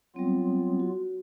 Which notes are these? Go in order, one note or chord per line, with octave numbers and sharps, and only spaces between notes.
F#3 G3 B3 C4 F4
F#4